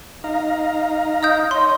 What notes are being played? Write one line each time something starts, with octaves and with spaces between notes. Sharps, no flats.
D#4 F5 A#5
D#5 D#6 G6
C#5 D#5 C6